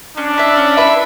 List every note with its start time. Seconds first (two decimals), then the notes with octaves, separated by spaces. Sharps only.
0.17 C#4 D4
0.37 E4 B4 E5
0.57 C#4
0.77 E4 B4 E5